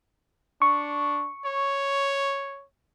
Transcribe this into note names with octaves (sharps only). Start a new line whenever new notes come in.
D4 C#6
C#5